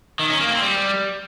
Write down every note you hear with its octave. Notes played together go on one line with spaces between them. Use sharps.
D#3
C#4
A#3
C4
G3